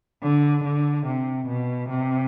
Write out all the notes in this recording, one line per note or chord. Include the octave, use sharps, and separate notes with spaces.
D3
D3
C3
B2
C3